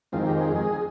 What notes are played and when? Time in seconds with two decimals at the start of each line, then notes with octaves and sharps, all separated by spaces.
0.12 F2 D#3 G#3 C4 F4
0.27 G4
0.41 G#4
0.55 G#4